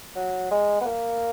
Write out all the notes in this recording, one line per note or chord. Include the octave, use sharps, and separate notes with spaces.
F#3
G#3
B3
A#3